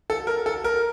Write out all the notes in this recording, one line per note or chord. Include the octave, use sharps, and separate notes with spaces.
A4
A#4
A4
A#4